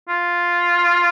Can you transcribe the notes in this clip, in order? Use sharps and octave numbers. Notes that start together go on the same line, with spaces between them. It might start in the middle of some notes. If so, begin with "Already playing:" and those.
F4